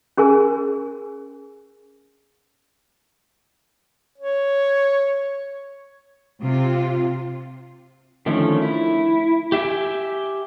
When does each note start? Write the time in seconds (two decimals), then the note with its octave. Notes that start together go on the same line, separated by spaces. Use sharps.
0.17 C#4 G#4 A#4 G#5
4.18 C#5
6.42 C3 F4
8.26 D3 D#3 F3 A3 C#4
8.62 E4
9.52 G4 E5 G5 G#5